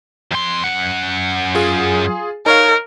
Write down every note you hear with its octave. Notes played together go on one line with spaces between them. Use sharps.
F2 C6
F#2 F#5
F4 G#4
D#4 A#4 C#5 F5